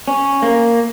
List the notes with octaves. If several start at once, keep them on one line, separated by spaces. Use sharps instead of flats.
C#4
A#3